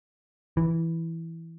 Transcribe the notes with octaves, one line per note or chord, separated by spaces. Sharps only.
E3